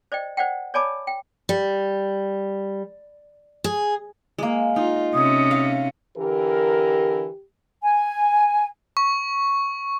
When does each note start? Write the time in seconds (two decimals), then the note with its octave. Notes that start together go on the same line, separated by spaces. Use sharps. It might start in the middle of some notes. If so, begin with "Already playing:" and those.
0.12 C5 D5 D#5 G5
0.37 C5 D5 F#5 G5
0.74 C#5 D5 G#5 A5 B5 D6
1.07 G5
1.49 G3
3.64 G#4
4.38 G#3 A#3
4.76 D#4 F4
5.14 C3 C#4 D#6
5.51 F5
6.17 D3 E3 G4 A#4
7.81 G#5
8.97 C#6